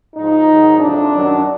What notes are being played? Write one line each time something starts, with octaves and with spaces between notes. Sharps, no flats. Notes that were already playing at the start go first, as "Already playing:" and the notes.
G#2 F3 D#4
G#2 D#3 F#3
F2 C3 F3 D4
F#2 D#3 F#3